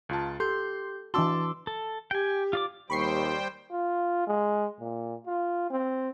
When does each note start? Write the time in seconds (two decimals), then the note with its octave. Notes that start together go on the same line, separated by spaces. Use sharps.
0.09 C#2 F4 A5
0.40 G4 A4 C6 G6
1.14 E3 D4 F#4 A5 C6 D6 E6
1.67 A4
2.11 G4 G5 G#5
2.53 F4 D5 D6
2.90 D#2 G3 C5 G5 B5 C#6 C7
3.71 F4
4.27 G#3
4.80 A#2
5.26 F4
5.70 C4